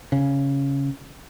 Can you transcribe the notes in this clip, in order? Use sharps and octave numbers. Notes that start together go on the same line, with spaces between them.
C#3